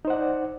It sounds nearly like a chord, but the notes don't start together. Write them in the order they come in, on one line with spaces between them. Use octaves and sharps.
D#4 C5 F#5 D5